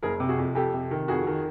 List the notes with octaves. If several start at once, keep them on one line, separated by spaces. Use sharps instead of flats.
F#1 G#4 A#4
C3
F#4 G#4
F2
F2 G4 A4
C3
D#3
F2 F#4 G#4
D#3